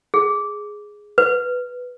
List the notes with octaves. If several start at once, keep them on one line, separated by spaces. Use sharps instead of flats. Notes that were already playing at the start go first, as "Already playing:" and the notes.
G#4
B4